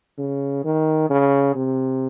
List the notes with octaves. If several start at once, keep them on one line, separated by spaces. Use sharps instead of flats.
C#3
D#3
C#3
C3